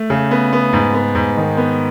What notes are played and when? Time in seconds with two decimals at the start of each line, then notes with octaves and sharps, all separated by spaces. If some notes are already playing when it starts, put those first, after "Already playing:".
Already playing: A3
0.10 C#3
0.31 B3
0.53 B3
0.73 G#2
0.94 B3
1.15 G#2
1.37 D#3
1.57 B3